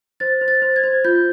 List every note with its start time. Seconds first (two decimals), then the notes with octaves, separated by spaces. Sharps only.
0.20 C5 A6
0.41 C5
0.48 A6
0.62 C5
0.76 G#6
0.84 C5
1.04 F4 G6